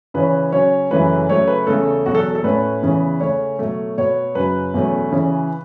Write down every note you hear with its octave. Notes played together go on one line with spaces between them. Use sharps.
C#3 E3 C#4 B4
C#3 F#3 C#4 C#5
F#2 C#3 E3 A3 C#4 B4
C#3 F#3 A3 C#5
B4
E2 C#3 A3 A4
E2 B2 F#3 F#4
A4
A4
A2 A3 C#4 B4
E2 C#3 E3 C#4
C#3 A3 C#4 C#5
B2 F#3 A3
B2 B3 C#5
F#2 C#3 F#3 B4
E2 B2 F#3 A3 C#4
C#3 E3 C#4